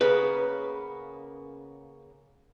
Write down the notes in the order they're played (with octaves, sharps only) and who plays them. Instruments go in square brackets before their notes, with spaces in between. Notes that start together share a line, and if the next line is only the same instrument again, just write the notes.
[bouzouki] C#3 A#3 B3 [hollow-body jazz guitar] B4